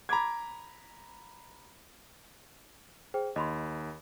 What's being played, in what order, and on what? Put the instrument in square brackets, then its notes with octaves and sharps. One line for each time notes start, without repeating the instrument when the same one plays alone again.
[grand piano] A#5 B5 D6 G#6
[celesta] G#4 C5 G5
[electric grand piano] D#2 [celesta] D#5 B5 C6